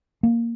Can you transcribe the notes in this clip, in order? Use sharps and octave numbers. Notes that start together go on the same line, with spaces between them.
A#3